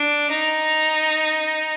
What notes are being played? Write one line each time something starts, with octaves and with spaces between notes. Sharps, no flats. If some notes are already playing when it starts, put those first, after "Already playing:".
Already playing: D4
D#4